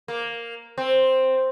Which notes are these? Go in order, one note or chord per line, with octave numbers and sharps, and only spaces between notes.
A#3
C4